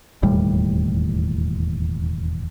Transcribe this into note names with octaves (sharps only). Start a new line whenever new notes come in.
E1 D#2 A2 G3